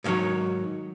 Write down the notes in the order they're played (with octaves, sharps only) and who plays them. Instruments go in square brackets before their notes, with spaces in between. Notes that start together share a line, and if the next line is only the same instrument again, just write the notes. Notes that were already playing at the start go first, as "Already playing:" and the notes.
[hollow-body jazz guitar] G#2 B2 D#3 F#3 C#5